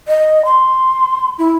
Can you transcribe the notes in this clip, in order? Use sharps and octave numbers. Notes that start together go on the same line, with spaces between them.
D#5
C6
E4